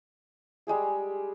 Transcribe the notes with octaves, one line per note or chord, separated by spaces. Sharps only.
G3 G#3 G4 G#4